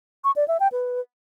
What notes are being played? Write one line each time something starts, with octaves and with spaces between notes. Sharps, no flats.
C#6
D5
E5
G5
B4